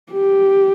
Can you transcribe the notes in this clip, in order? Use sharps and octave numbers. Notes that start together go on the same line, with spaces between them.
G4